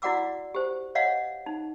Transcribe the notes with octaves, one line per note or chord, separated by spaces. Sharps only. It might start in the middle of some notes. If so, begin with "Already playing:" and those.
E4 F#4 D5 F#5 D6 E6
G4 C5
C#5 D#5 F5 F#5
D#4